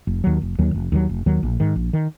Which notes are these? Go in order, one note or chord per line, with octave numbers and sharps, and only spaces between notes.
F1
D#2 D#3 F#3
F1
D#2 D#3 F#3
F1
D#2 D#3 F#3
F1
D#2 D#3 F#3
A#1
G#2 D#3
A#1
D#3